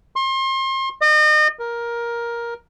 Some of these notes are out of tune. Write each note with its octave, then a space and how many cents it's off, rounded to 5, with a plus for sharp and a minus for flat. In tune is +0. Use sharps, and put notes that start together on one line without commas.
C6 +35
D#5 -35
A#4 +15